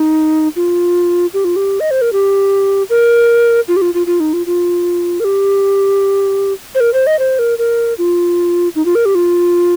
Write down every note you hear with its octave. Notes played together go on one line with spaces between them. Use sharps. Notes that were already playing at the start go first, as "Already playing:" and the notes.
Already playing: D#4
F4
G4
F4
G4
D#5
C5
A#4
G4
A#4
F4
G4
F4
F4
F4
D#4
F4
F4
A#4
G4
C5
A#4
C5
D#5
C5
A#4
A#4
F4
D#4
F4
A#4
G4
F4